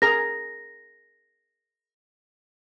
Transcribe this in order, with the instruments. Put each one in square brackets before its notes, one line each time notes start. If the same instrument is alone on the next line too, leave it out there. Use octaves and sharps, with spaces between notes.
[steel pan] G#4 A#4 A#5 [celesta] A#6